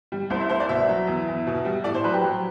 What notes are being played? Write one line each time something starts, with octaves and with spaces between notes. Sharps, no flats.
G3
C2 C5
E5
C2 C5
D5
B2 E5
F#3
E2
E2
B2
G3
A2 D5
C5
F#3 B4
G4
F#3